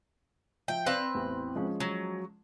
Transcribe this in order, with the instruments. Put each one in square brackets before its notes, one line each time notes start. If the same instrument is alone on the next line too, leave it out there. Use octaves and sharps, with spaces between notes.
[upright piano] F3 E5 [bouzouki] G5
[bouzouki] C4 B4 [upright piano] D5 F5 C6
[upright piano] A1 E2
F3 G#3 C#4
[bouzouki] F#3